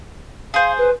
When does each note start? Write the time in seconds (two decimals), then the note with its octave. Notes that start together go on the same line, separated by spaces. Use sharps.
0.54 G#4 C5 F5
0.78 B4